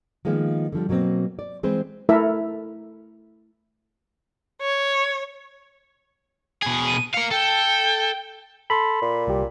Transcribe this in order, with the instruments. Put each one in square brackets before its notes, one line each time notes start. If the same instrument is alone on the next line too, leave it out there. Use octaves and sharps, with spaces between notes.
[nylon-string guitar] D#3 F3 G#3 A#3 B3
D3 F3 G3
B2 F#3 A#3 C4
D5
E3 G#3 C4 B4 C5
[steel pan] A3 E4 A4 A#4 E5
[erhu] C#5
[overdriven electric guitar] B2 G#4
[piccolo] D#7
[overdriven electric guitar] A#4 F5 [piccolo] C#7
[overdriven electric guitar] A4 [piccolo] G5
[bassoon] A4 [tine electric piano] B5 C6
[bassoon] A#2
[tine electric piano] C2 G4